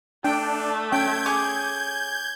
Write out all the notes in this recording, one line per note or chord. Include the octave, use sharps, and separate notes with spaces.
A3 D4 G5
C#4 G5 G6 G#6
G#4 C#5 D6